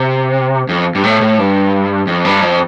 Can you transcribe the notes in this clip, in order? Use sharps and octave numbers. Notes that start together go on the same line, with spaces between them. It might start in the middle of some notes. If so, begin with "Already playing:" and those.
Already playing: C3
F2
G2
A2
A2
G2
F2
G2
F2